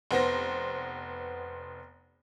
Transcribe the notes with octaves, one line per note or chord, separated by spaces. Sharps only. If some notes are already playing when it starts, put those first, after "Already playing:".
F1 B3 C5 A#6